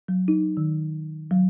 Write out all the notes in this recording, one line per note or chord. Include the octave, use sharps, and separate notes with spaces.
F#3
D#4
D#3
F#3